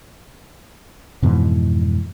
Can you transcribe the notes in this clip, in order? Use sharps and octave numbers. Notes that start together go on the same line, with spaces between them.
F2 G#2 B2 E3